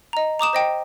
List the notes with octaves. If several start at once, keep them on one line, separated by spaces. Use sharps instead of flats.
D#5 A#5
A#5 D6 D#6 E7
C5 D#5 G5